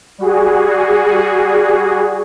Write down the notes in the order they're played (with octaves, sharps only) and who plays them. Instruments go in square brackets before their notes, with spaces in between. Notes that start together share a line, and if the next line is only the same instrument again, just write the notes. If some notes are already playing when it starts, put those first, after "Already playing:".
[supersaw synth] G3 F#4 G#4